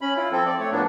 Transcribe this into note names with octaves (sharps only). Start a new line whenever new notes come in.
C#4 B5
E4 F4
F3 C4 A4
D5
A3 C#5
A2 F3 A#3 B3 D4